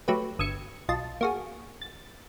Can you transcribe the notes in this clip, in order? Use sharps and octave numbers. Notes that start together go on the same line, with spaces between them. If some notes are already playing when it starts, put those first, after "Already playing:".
F#3 A3 G4 B4
G1 D#6 E6 G#6 C#7
B1 F4 D#5 A5
A#3 F#4 G#4
A6